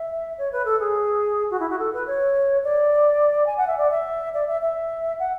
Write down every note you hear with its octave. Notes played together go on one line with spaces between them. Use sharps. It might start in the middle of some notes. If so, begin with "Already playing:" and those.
Already playing: E5
C#5
B4
A4
G#4
F#4
E4
F#4
A4
B4
C#5
D5
G#5
F#5
E5
D5
E5
D5
E5
E5
F#5